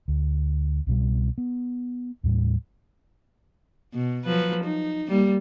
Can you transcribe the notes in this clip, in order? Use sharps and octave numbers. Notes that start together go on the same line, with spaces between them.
D2
C2 B2 G3
B3
D#2 A2 G3
B2
F3 F#3 B4
D#4
G3 A#3